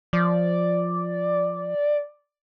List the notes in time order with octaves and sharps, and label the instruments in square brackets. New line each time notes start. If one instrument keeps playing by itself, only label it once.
[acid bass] F3 [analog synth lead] D5